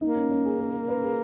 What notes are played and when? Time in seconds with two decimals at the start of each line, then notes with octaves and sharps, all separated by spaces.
0.01 A#3 D#4
0.16 C#4
0.30 C#4
0.45 G#4
0.60 A#4
0.74 A#4
0.88 B4
1.03 G#4